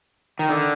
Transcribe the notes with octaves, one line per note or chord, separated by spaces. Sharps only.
D#3
D3